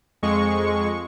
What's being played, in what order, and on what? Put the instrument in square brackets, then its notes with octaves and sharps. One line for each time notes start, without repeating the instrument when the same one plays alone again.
[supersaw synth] F2 G#3 C#6